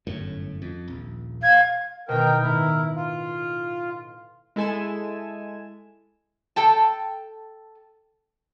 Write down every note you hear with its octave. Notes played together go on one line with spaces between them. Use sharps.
G1 F#2 A2
F2
D#1 A#1
F5 G#6
B2 D#3 A#4 G5
A2 E4 A#4
F4
G#3 E4 A4 G#5 G#6 E7
A4 G5 A5